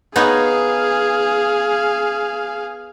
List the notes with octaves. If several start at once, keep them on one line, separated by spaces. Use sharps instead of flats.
B3 D#4 G#4 C#5 F5